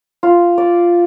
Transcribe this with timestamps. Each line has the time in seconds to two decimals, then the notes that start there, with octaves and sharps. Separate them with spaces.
0.23 F4
0.58 D5